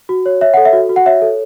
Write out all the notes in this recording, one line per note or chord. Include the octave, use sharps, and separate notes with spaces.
F#4
C#5
C#5 E5
A4 F#5
E5
F#4
F#4
F#5
C#5 E5
A4